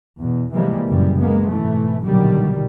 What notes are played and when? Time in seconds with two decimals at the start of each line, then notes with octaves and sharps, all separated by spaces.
0.19 E2 B2
0.53 C3 E3 F3 G3 G#3 A#3
0.89 A#1 F#2 C#3 E3 G3
1.20 G#3 A#3 B3
1.50 G#2 B2 E3 A3
2.04 A#1 B2 D3 D#3 F#3 G3